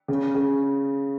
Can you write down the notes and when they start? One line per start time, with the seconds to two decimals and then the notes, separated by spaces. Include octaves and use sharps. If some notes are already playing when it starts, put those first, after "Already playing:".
0.08 C#3
0.34 C#3